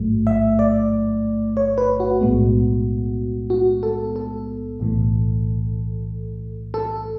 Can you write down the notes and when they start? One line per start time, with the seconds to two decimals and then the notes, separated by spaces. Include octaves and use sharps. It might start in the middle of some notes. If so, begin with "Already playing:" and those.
Already playing: A1 G#2 F#3 A3
0.27 E5
0.59 D5
1.57 C#5
1.78 B4
2.00 F#4
2.21 B1 A2 G#3 B3
3.50 F#4
3.83 A4
4.16 A4
4.80 B1 A2 E3
6.74 A4